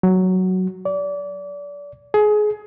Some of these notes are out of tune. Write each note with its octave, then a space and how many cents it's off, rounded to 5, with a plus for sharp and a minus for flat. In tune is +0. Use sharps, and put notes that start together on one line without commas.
F#3 +5
D5 -30
G#4 +25